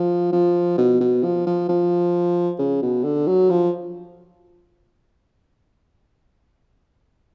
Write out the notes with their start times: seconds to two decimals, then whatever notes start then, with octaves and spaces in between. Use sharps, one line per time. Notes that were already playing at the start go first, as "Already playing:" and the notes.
Already playing: F3
0.32 F3
0.78 B2
1.00 B2
1.24 F3
1.47 F3
1.69 F3
2.59 C#3
2.83 B2
3.04 D3
3.27 F#3
3.50 F3